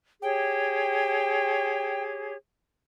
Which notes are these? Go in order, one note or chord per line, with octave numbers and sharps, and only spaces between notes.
G4 G#4 C#5 G5